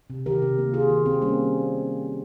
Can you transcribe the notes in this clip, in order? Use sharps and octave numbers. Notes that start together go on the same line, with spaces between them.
C3
D#3 G4 A#4
C3
A#3
C3 F4 G#4
D#3
C3 C4
G3 A#3 C#4